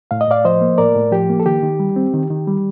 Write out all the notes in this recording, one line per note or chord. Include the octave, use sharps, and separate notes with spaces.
A2 F5
D#5
A2 D5 F5
F3 C5 D#5
A#3
A2 A#4 D5
A2
F3 G4
A#3
A4
D#3 G4
D#3
G3
C4
D#3
D#3
G3